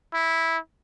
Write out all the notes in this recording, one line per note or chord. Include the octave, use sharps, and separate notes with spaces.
E4